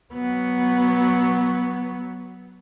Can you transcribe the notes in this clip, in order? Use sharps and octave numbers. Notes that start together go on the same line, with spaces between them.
F#3 B3